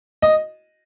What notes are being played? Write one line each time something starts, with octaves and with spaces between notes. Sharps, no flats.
D#5